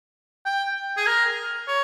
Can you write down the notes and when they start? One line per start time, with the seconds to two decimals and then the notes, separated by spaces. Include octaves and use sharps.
0.45 G5
0.97 G#4
1.06 A#4
1.67 C#5